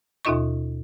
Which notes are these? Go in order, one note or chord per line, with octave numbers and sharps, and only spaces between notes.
D#2 B2 D#4 F4 D#5 C#6